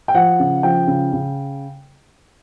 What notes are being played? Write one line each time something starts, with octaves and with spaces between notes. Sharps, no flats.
G5
F3 F#5
C#3
F3 G5
C#3
C#3